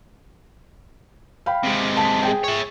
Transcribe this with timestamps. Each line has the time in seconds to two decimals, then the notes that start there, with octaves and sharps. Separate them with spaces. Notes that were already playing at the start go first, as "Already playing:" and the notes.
1.46 F5 G5 B5
1.63 C3 G#3
1.97 A5 B6
2.23 G#4 G5
2.44 C#5 E5